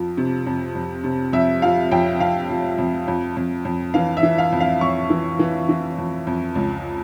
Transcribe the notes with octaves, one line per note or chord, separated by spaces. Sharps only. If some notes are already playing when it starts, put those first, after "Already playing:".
Already playing: F2 F3
C3
F2
F2
C3
F2 E5
F3 F5
F2 G5
F2 F5
F3
F2
F2
F2
F2
E3 F5
E5
E3
F5
F2
F5
F2 C#6
E3
E3
E3
F2
F2
C#2